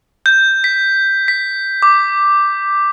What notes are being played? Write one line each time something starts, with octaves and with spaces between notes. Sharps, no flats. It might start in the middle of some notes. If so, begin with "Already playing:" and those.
G6
B6
B6
D6